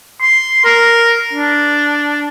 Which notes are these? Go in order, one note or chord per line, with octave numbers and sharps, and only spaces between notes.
C6
A#4
D4